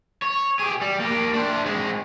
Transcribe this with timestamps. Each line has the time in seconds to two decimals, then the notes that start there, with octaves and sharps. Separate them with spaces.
0.22 C#5
0.59 G4 G#4
0.81 G3
1.00 A#3 G4
1.34 D4 C5
1.66 G#3 C4